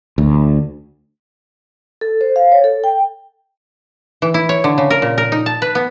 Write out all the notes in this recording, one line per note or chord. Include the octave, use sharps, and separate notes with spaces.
D2
A4
C5
F5
C#5
A4
G5
E3
E4
C#5
D3
C#3
A#4
A#2
A#4
D#4
A5
B4
B3